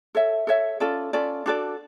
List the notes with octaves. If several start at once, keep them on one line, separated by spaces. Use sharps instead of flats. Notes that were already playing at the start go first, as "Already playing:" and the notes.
A4 C#5 E5
A4 C#5 E5
C#4 F4 A4 D5
C#4 F4 A4 D5
D4 F#4 A4 D5